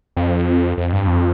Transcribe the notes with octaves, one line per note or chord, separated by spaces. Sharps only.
F2
F2
G2
F2